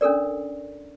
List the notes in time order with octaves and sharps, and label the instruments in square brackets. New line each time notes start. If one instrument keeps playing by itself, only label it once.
[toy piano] C#4 D4 A4 A#4 D5